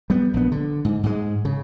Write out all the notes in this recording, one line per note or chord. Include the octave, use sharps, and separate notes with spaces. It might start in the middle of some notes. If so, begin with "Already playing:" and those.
G3 B3
A#1 B3
D3
G#2
G#2 G#3
C#3